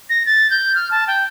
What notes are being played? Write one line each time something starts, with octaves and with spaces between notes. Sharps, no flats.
A#6
A6
G6
F6
A5
G5